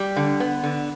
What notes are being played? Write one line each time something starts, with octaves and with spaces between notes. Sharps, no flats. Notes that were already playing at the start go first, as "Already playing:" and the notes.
Already playing: G3
D3
B3
D3